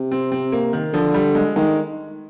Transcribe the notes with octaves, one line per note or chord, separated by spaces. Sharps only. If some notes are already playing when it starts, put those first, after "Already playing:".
Already playing: C3
C4
C4
A#3
D#3
D3 F3
G3
G#3
D#3 G#3